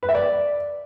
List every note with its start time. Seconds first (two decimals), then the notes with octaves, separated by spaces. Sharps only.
0.03 B4
0.09 E5
0.15 D5